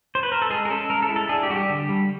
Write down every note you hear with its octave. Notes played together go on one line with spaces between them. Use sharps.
C5
B4
A#4
A4
G#3 G#4
A#4
C#4 A4
G#3 A#4
A4
E4
A4
D4 G#4
G4
G3 F#4
G4
D3
G3